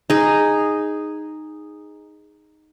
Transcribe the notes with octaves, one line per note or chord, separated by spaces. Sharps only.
D#4 G#4